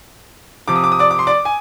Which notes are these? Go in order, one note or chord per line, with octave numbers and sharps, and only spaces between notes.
C3 F3 D6
D#6
D6
D#6
D5 D6
D6
C6
D5 D6
G#5